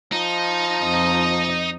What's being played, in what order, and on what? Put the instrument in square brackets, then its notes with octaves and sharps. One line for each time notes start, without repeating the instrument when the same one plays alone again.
[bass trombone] F3 [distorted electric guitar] D#4
[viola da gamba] F2 D#5